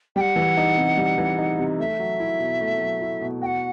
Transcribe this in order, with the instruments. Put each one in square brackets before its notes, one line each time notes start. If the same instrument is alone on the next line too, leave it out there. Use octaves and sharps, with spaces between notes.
[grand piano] G3 [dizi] F#5 G5
[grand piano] E3
D#4
C3
G3
E3
D#4
C3
[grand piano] A3 [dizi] E5
[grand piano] F#3
E4
B2
A3
F#3
E4
B2
[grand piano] F#4 [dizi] G5
[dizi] F#5